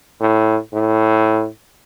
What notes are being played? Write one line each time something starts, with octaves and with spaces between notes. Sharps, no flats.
A2
A2